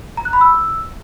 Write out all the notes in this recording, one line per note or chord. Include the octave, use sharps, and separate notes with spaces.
A#5
F#6
B5
E6